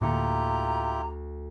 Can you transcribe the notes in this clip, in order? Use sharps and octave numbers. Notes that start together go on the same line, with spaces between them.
D2 A2 A#3 E4 F4 G4 A#5 C#7